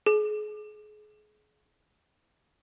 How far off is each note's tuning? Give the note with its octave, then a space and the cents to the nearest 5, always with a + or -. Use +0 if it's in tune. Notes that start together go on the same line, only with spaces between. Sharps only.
G#4 +35